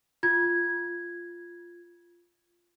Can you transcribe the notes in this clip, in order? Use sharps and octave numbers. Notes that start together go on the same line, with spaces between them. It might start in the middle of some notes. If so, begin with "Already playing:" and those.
F4 G#6